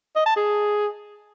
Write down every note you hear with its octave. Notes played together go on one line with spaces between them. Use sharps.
D#5
A5
G#4